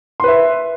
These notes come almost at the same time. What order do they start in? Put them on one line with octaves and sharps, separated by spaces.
C6 B4 E5